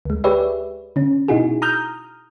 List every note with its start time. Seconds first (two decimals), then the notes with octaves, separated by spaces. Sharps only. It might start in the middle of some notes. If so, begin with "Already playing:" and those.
0.05 D2 G#3
0.24 G4 G#4 B4 C#5 D5 E5
0.96 D3 C#4
1.28 B2 D#4 E4 F#4 G#4
1.62 A#5 D#6 F6 G6